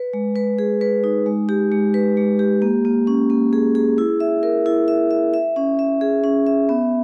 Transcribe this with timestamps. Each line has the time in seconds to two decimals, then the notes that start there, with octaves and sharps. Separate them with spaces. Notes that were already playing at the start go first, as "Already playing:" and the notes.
Already playing: B4
0.13 G#3
0.36 B4
0.59 G#4
0.81 B4
1.04 D#4
1.26 G#3
1.49 G4
1.72 G#3
1.94 B4
2.17 G#3
2.39 G4
2.62 A#3
2.85 A#3
3.07 C#4
3.30 A#3
3.53 G#4
3.75 G#4
3.98 E4
4.20 E5
4.43 A#4
4.66 E4
4.88 E5
5.11 E5
5.34 E5
5.56 C#4
5.79 E5
6.01 G#4
6.24 C#4
6.46 E5
6.69 B3